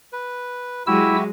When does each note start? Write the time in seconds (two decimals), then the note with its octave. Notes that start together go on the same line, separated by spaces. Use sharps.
0.13 B4
0.87 F#3 G#3 E4 F#4 G4 E5 E6